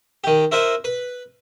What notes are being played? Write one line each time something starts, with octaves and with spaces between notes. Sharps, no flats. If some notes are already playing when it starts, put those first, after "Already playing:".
D#3 G4
E4 A#4 C5 D#5 E5
B4